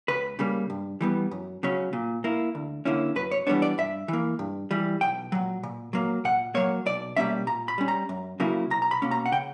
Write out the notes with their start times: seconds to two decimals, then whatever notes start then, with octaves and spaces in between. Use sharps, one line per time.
0.08 C#2 B4
0.39 C#3 G3 A#3
0.70 G2
1.01 E3 G3 B3
1.31 F#2
1.63 C#3 F#3 C#4
1.93 A#2
2.24 A#3 E4
2.55 D2
2.85 D3 A#3 C#4 E4
3.16 F#2 B4
3.31 C#5
3.47 E3 G3 B3 D4 C#5
3.62 D5
3.78 G2 E5
4.08 E3 A#3
4.39 G2
4.71 E3 G3
5.01 B1 G5
5.32 A#2 F#3
5.63 A#2
5.93 F#3 A#3
6.25 A#2 F#5
6.55 F#3 A#3 C#5
6.86 B1 D5
7.17 B2 G3 A#3 C#4 E5
7.47 A#2 A#5
7.68 B5
7.78 G3 C#4
7.88 A#5
8.09 F#2
8.40 C#3 F#3 A#3 E4
8.70 B1 A#5
8.82 A#5
8.91 B5
9.02 B2 A#3 C#4
9.11 A#5
9.26 F#5
9.32 C#3 G5